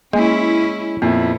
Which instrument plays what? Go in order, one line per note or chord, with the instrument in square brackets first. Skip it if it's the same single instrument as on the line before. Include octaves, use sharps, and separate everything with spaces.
[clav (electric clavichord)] G#3 [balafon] A#3 [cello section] C#4 E4
[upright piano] F2 E4 [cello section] A#2 B3 [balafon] A#3